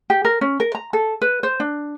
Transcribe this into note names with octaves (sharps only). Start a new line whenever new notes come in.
G4
A#4
C#4
A#4
A#5
A4
B4
C5
D4